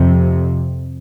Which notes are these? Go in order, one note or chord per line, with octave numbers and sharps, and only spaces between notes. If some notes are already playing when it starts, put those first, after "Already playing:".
Already playing: F2 C3